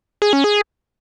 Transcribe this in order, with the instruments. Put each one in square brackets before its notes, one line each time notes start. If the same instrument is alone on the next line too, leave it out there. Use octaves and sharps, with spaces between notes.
[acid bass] G#4
C#4
G#4